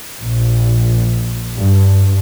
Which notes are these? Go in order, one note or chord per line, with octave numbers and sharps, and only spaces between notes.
A#1
G2